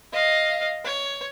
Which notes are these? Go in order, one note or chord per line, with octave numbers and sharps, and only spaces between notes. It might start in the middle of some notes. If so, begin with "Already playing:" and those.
D#5 F5
C#5